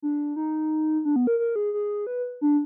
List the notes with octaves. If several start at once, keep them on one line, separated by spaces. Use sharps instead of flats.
D4
D#4
D4
B3
A#4
A#4
G#4
G#4
B4
D4